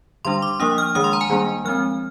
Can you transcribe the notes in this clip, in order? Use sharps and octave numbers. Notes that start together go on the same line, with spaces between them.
D3 G3 D4 C6
D6
F3 A#3 D4 D#6
F6
D#3 G#3 D4 D#6
C6
A#5
G#5
D#3 G3 A#3 D4
F3 G#3 C4 F6